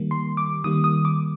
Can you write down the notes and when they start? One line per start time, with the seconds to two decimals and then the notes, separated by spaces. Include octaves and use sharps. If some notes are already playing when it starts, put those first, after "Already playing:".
Already playing: D#3 G3 A#3
0.11 C6
0.37 D6
0.64 D#3 G3 A#3 D#6
0.84 D#6
1.05 D6